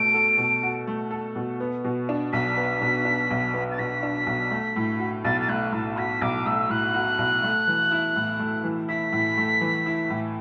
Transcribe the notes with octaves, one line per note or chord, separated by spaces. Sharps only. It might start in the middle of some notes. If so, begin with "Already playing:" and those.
Already playing: B2 A3 A4 D7
A4
B2
F#4
A3
A4
B2
B3
B2
D4
B1 B6
B3
B2
D4
B1
B3
A6
B2 B6
D4
B1
A3
A2
F#4
B1 A6
A6
A3 F#6
A2 A5
F#4 B6
B1 D6
A3 E6
A2 F#6
F#4
B1
A3
E3
E4
A2
A3
E3
E4 B6
A2
A3
E3
E4
A2